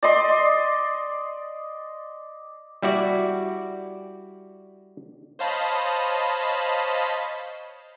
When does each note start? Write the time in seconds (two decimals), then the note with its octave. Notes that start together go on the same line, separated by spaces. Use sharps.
0.03 D5 D#5 C6
2.82 G3 E4 F#4 D5
5.39 C5 C#5 D#5 F5 A5 B5